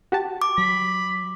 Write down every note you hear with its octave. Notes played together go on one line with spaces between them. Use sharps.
F#4 G4 A5
D6
F#3 B5